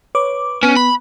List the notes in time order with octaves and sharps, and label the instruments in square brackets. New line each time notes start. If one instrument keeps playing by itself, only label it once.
[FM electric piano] B4 C#5 D6
[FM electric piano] B3 [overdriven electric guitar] C#4
[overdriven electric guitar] B5